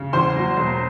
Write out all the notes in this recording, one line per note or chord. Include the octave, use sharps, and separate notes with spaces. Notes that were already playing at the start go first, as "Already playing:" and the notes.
Already playing: C#3
E2 C5 C6
F#3
E1